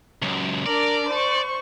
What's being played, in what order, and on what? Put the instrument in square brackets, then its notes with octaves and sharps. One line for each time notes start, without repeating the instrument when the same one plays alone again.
[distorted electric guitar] C#2 F#2
[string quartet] D4 A#4 [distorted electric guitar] D5
[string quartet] C5 C#6